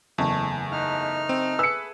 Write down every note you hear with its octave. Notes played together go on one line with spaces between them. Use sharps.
F#1 E2 A3 G#5
D#4 F#5 F6
C4
G#4 B4 E6 C#7